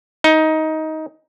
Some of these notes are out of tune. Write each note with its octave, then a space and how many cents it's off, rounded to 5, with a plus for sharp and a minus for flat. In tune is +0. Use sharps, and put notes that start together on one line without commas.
D#4 +15